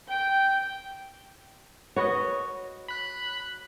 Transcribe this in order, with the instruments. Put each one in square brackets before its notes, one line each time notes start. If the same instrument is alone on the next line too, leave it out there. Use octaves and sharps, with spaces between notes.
[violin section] G5
[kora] F#4 B4 D#5 [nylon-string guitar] C#5
[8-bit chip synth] B5 F#6